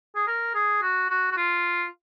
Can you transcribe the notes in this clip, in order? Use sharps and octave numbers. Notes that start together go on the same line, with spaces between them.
G#4
A#4
G#4
F#4
F#4
F#4
F4